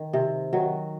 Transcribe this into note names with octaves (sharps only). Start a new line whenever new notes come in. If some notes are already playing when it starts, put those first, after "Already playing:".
Already playing: D#3
C3
D#3 F#3